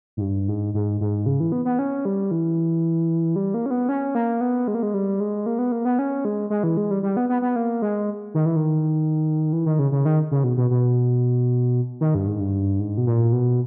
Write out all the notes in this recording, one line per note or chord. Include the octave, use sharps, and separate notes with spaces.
G#2
G2
G#2
G#2
G#2
C#3
E3
B3
B3
C#4
G3
E3
G3
A#3
C#4
B3
C#4
A#3
B3
G#3
A#3
G#3
G3
G#3
A#3
B3
A#3
B3
C#4
G#3
G#3
E3
G#3
G3
G3
B3
B3
B3
A#3
G#3
D#3
E3
D#3
E3
D#3
C#3
C#3
D#3
C#3
B2
B2
B2
D#3
G2
G#2
G2
G#2
B2
A#2
B2